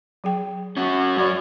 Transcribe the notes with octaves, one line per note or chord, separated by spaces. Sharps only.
F#3 G#4 G5
C#4 F#4
F#2 F#4 C#5 D5